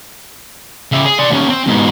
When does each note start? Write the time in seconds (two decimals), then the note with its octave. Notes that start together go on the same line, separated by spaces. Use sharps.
0.92 C#3 E5
1.06 G#4
1.19 D5 C6
1.30 D#2 C#4
1.50 C4
1.67 G#2 B2